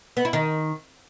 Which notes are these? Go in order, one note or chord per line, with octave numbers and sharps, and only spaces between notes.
B3
E4
D#3